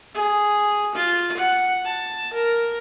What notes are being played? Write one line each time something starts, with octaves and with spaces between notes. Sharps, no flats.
G#4
F4
F#5
A5
A#4